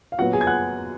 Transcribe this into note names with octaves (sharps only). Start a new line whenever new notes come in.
F5
A#2 F#3 B3 F#4 F#5
G#4 G#5
G#6
F#5 F#6